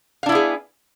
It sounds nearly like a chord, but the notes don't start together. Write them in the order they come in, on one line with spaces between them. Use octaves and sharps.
F5 D4 E4 B3 G#4